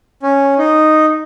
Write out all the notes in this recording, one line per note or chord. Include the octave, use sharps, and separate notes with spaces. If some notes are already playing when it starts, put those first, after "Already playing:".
C#4
D#4